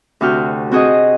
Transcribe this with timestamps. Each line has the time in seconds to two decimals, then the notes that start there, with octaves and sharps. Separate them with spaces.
0.21 D2 C3 F#4 F6 G6
0.72 C4 F#4 G#4 C5 D#5